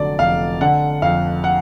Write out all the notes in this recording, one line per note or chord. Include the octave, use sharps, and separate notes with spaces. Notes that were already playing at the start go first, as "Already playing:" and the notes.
Already playing: F1 D3 F#3 D5
F1 F5
D3 F#5
F2 F5
F#5